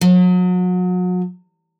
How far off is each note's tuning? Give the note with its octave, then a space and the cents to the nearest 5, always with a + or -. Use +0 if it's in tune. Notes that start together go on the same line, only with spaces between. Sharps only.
F#3 -35